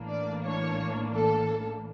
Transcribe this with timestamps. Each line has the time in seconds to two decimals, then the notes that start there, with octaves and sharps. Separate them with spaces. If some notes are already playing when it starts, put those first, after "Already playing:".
Already playing: A1 A2 E3 A#3 D4
0.09 D5
0.44 C#5
1.15 A4